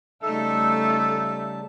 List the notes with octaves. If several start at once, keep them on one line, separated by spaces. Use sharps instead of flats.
C#3 G3 A3 D#4 A4 E5 A5